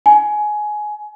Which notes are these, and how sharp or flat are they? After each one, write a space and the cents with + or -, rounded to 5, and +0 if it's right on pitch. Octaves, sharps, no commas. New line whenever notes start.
G#5 +15